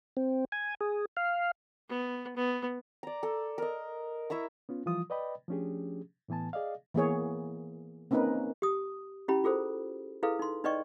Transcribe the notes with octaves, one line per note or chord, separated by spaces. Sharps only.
C4
G#5
G#4
F5
B3
B3
D5 A#5
A4
A#4 D#5
E4 E5 A#5 C#6
B3 C#4 F4
E3 F3 G3 F4 D#6
B4 D5 D#5 G5 B5
F3 A3 C#4 D4 G4 G#4
A2 E3 B3 G#5 A5
G#4 D5 D#5 F5
E3 A#3 B3 G#4 C#5
A#3 C4 C#4 D#4 A#4 B4
G4 D#6
C#4 E4 G4 B5
F4 G#4 A4 C5
E4 G#4 A4 B4 F5
D#4 C6
D#4 B4 D5 D#5 G5 C#6